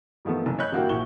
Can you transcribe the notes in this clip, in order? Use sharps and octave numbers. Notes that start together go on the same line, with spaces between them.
G2 D#3 F3 A3 B3
F#1
C#5 D#5 B5 F#6 G6
G2 D3 A#3 E4 F#4 G5
A#1 A#2 E4 F#5 C#6 G7